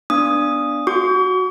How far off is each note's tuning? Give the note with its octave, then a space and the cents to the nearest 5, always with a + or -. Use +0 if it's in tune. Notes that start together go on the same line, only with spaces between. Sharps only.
B3 +0 D4 +0 D#6 +0
F#4 +0 C#6 +40